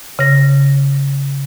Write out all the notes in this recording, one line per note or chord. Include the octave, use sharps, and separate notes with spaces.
C#3 A#6